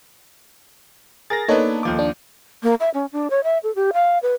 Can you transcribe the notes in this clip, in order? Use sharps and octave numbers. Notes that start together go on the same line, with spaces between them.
G#4 A#4 A6 A#6
A#3 B3 D4 D#4 A4 C#5
D#2 F3 D6
D4
A#3
E5
C#4
D4
C#5
E5
A4
G4
F5
B4